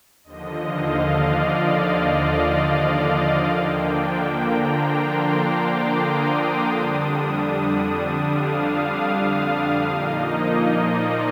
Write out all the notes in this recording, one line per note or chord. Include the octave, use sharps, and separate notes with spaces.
D#2 D3 F3 D#5
F5
D5
D#5
F5
D3 F3 A#3 D4 G5
A#5
C6
D6
D#6
F2 D3 G3 D4
F5
A#2 F3 A#3 D#4 D#5
D5